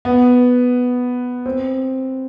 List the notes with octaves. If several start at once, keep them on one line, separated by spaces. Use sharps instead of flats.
B3
C4